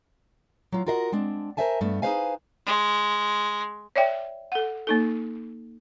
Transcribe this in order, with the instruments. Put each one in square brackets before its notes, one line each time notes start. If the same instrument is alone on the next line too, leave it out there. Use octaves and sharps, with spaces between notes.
[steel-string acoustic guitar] F#3 F4
F4 F#4 A#4 D#5 E5 F#5
G#3 C4 D4
A#4 C5 D5 E5 G#5 A5
G2 A3 B3
D#4 G#4 B4 C5 F5 G#5
[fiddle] G#3
[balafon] C#5 D5 E5 G5
A4 F#5
A#3 D#4 A4